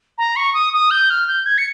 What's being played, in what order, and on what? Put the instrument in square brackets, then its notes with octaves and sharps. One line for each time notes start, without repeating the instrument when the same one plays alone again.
[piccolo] A#5
C#6
D#6
D#6
G6
F6
G6
G#6
C#7